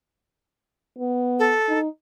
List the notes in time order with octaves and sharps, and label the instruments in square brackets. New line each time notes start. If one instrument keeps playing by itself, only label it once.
[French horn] B3
[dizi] A4
[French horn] D#4